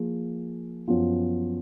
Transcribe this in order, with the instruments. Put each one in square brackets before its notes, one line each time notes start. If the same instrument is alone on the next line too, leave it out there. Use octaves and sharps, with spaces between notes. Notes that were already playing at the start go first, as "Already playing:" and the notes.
Already playing: [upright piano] F3 A#3 F4 G#4
F#2 F3 B3 F4